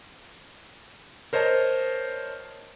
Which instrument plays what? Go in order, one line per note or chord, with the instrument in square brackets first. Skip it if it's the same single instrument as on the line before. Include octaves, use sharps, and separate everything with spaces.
[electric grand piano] A#4 C5 C#5 D#5 A5